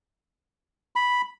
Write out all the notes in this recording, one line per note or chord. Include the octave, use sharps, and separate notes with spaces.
B5